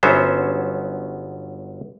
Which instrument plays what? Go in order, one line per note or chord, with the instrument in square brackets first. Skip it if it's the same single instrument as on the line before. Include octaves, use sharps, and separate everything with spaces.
[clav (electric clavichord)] G1 F#3 B3 C#4 C5 E5